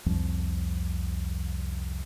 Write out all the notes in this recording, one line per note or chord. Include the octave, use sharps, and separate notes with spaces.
C2 F2 F3